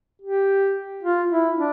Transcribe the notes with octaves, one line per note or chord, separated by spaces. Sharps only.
G4
F4
E4
D4